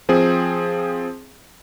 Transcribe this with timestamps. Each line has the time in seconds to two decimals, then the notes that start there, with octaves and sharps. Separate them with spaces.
0.09 F3 C4 G#4